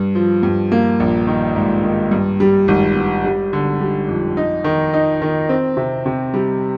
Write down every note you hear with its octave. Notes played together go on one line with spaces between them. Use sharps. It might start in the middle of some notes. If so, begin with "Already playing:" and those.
Already playing: G2
F3
G2
A#3
A#1
D#3
G#2
D#3
G2
G3
G#1
G2
G3
D3
G3
F2
D#4
D#3
D#4
D#3
C4
C3
C3
G3